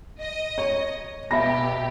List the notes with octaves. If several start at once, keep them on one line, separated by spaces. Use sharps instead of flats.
D#5
C#5
B2 G4 E5 B5 A#6